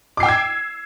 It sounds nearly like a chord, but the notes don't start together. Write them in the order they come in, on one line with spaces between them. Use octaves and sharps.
D6 C7 G5 E6 G#6